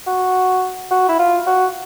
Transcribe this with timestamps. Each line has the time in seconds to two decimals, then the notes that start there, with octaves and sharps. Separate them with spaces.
0.07 F#4
0.91 F#4
1.09 E4
1.19 F4
1.47 F#4